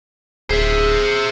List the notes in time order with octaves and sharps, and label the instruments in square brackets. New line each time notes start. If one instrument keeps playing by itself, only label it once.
[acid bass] D1 [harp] G#4 [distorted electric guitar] C5 E5